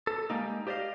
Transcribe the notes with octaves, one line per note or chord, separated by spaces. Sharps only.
A4
G3 G#3 A#3 D#4
G4 C5 D5 D#5 F5